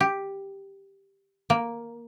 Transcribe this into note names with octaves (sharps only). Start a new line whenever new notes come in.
G4
A#3